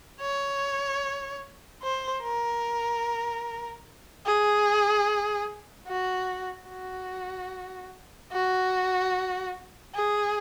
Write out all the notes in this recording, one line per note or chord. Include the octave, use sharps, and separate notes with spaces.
C#5
C5
A#4
G#4
F#4
F#4
F#4
G#4